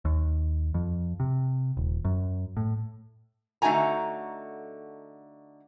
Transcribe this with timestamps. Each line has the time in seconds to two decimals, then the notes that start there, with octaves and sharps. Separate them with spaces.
0.05 D#2
0.74 F2
1.20 C3
1.77 D#1
2.05 F#2
2.57 A2
3.62 D3 A3 D#4 F#4 G#5 A#5